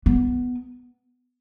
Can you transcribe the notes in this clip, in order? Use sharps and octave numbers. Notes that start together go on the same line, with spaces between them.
B3